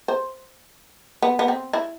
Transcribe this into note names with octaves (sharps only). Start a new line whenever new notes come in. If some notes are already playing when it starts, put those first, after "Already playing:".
C5
B3
B3
C4
E4